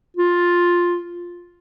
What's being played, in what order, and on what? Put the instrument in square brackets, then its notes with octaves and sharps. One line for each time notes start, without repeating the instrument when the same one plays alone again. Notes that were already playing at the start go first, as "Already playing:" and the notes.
[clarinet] F4